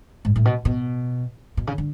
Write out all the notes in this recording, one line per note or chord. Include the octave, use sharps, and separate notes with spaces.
G#2
A2
B2
B2
B2
C#3
D3